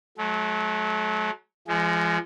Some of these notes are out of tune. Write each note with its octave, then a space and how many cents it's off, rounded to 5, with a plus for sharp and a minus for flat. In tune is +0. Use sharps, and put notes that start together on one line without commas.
F#3 +0 A3 -40
F3 -35 G#3 +5